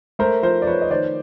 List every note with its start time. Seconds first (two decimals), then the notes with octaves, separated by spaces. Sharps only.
0.19 A3 A#4 C5
0.43 F3 A#4 C5
0.62 D5
0.67 F3 B4 C#5
0.82 D#5
0.90 D#3 C5 D5